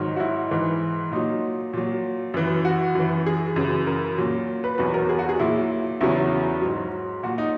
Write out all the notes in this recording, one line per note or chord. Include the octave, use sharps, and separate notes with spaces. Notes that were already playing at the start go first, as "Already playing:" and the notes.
Already playing: G#2 D#3 F#3
F#4
E4
G#2 E3
A#2 F#3 D#4
A#2 F#3
F#2 E3
F#4
F#2 E3
G#4
F#2 C#3 E3
A#4
A#2 F#3
B4
E2 B2 F#3 B4
A#4
G#4
F#4
G#4
A#2 F#3 E4
E2 C#3 F#3 E4
G#2 F#3
A#2 F#3 F#4
D#4